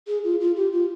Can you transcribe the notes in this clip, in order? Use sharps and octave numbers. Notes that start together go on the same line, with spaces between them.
G#4
F4
F4
G4
F4